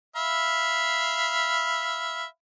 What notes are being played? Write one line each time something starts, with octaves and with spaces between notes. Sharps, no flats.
E5 F5 B5